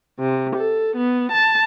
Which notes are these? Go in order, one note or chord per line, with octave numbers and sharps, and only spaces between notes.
C3
A4
B3
A5